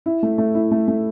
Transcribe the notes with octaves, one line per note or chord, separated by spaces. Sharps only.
E4
A3
A3
E4
A3
A3